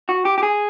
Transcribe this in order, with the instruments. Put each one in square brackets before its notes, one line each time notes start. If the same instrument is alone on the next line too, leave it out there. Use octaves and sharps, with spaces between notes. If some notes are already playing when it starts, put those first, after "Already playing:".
[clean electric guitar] F#4
G4
G4
G#4